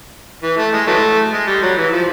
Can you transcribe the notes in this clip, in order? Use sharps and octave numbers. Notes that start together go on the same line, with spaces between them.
E3
A3
G#3
E3 F#3 A3
G#3
G3
F#3
E3
F3